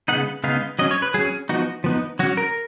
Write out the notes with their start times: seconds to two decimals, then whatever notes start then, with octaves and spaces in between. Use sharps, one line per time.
0.08 C#3 G#3 B3 D#4 F#5
0.44 C#3 G#3 B3 D#4 F5
0.79 F#3 C#4 D#5
0.91 C#5
1.02 B4
1.14 F#3 C#4 G#4
1.49 F3 B3 D#4 F#4
1.84 F3 B3 D#4
2.19 F#3 F#4
2.23 C#4
2.37 A#4